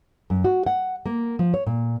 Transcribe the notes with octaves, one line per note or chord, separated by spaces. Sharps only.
F#2
F#4
F#5
A#3
F3
C#5
A#2